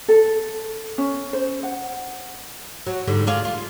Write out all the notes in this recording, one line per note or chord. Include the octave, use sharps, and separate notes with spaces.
A4
C#4
C5
F#5
F#3
G#2 D3 G3
F4 G#4 D5
F4